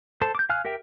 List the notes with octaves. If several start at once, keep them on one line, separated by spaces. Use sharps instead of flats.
A4 C5 A5
D6 G6
F5 G#5 F6 F#6
G4 A#4 E5 G5